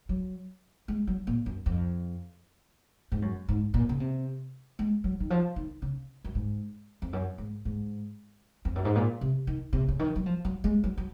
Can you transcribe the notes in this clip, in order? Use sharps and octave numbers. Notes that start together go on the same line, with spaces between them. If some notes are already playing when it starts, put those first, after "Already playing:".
F#3
G#3
F#3
A#2
F#2
F2
G#2
F#2
G#2
A#2
C#3
C3
G#3
F#3
D#3
F3
D#3
C#3
F#2
G#2
F2
F#2
G#2
G#2
F2
F#2
G#2
A#2
C3
D#3
C3
C#3
D#3
F#3
F3
F#3
G#3
F#3
F#3